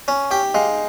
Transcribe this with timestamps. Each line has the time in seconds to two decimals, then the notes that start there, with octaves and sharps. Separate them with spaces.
0.08 C#4
0.31 G4 G5
0.54 G#3 F5